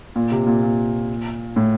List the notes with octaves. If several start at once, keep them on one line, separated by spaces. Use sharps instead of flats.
A#2
C3
A#2
A#2
A2